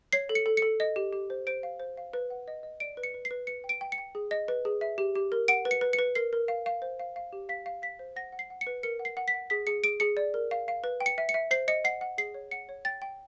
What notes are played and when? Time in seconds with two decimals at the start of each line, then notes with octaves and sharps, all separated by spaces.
0.13 C#5 C7
0.29 A4
0.35 C#7
0.46 A4
0.57 C#7
0.62 A4
0.80 D#5
0.96 G4
1.13 G4
1.30 C5
1.47 C5 D7
1.63 F5
1.80 C5
1.97 F5
2.13 B4
2.30 F#5
2.48 D#5
2.63 D#5
2.80 D5 D7
2.97 B4
3.03 C#7
3.14 B4
3.25 C7
3.31 B4
3.47 B4 C#7
3.64 G5
3.69 D7
3.81 G5
3.92 C#7
3.98 G5
4.15 G#4
4.31 D#5
4.48 B4
4.65 G#4
4.81 E5
4.98 G4
5.15 G4
5.32 A#4
5.48 F#5 D7
5.65 B4
5.71 C#7
5.81 B4
5.93 C#7
5.99 B4
6.15 A#4 C7
6.33 A#4
6.48 F5
6.66 F5
6.82 C5
6.99 F5
7.16 F5
7.33 G4
7.49 F5 B6
7.66 F5
7.82 F5 B6
7.99 C5
8.16 F#5 A#6
8.32 F#5
8.39 C7
8.50 F#5
8.61 C#7
8.67 B4
8.83 A#4 C#7
8.99 F#5
9.05 C7
9.17 F#5
9.28 B6
9.34 F#5
9.50 G#4 B6
9.67 G#4 C#7
9.84 G#4 D7
10.00 G#4 C#7
10.17 D5
10.34 A#4
10.51 F5
10.68 F5
10.84 B4
11.00 G5
11.06 C#7
11.18 E5
11.29 C#7
11.34 E5
11.51 C5 C7
11.68 D#5 C#7
11.84 F#5 C7
12.01 F#5
12.18 G#4 C7
12.34 C#5
12.51 F#5 C#7
12.69 C#5
12.85 G5 A6
13.02 G5